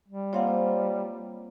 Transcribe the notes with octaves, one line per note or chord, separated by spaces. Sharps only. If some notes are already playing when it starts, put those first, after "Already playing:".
G3
A#3 C4 F4 C#5 F5 F#5